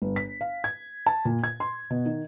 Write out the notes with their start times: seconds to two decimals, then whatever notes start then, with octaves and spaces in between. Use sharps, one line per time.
0.02 G1
0.16 B6
0.41 F5
0.64 G#6
1.06 A5
1.25 A#2
1.44 G#6
1.60 C6
1.90 B2
2.06 D#3